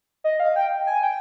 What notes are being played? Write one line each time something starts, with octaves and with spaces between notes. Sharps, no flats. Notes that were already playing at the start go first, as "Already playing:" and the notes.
D#5
F5
G5
G#5
G5